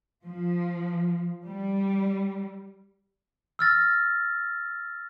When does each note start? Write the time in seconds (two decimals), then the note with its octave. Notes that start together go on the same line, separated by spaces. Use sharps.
0.24 F3
1.46 G3
3.59 E6 F6 A6 A#6